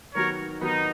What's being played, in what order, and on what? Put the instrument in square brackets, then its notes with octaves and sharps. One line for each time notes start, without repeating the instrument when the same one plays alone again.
[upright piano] D#3 F#3 B3 F#4 [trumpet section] A#4 C#5
[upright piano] D#3 F#3 B3 F#4 [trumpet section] D#4